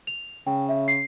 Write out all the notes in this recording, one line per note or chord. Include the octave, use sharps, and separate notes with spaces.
F7
C#3 G5
E5
C7